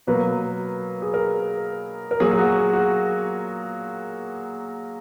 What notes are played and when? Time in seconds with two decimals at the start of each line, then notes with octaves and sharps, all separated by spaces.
0.07 B2 F#3 A#3 B4
1.02 G#4
1.14 A#4
2.11 A#4
2.20 A#2 F#3 A#3 G#4
2.31 G#4
2.39 F#4
2.56 G#4
2.73 F#4